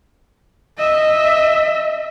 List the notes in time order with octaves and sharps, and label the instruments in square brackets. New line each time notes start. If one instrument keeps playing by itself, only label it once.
[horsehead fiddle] D#5 E5